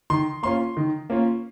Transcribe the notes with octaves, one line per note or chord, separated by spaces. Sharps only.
D#3 C6
A#3 C#4 F4 C6
D#3
A#3 C#4 F4